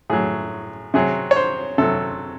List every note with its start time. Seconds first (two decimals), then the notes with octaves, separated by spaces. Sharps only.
0.10 A2 F#3 G#4
0.94 C3 F#3 G#4
1.31 C#5
1.36 C5
1.78 C3 F#3 A4